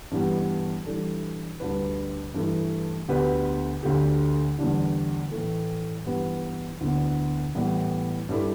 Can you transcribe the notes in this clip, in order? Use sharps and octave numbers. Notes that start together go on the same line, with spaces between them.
G2 E3 G3 B3 G4
E3 G3 D4 A4
D2 D3 G3 D4 B4
G2 E3 A3 E4
D2 D3 B3 G4 B4
D2 D3 A3 G4
E2 D3 G3 D4
A2 E3 A3
G2 E3 B3 G4 B4
D2 D3 B3 E4
A2 E3 G3 B3 E4
G2 G3 E4 A4